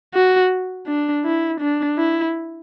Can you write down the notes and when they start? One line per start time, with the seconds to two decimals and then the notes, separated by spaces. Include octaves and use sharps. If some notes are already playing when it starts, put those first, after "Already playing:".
0.14 F#4
0.87 D4
1.25 E4
1.60 D4
1.98 E4